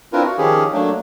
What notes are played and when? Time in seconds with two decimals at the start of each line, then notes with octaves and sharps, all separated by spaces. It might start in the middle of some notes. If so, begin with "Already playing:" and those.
0.13 C4 D4 E4 F4 A#4 B4
0.25 F#4
0.38 D#3 F3 C#4 G4 G#4
0.73 F#3 A3 A#3 D4